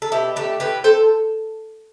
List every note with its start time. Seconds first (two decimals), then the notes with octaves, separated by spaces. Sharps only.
0.02 A4
0.12 B2 E4 G4
0.36 A3 G4 B4
0.40 D4
0.60 A2 G4 B4
0.84 A4 C5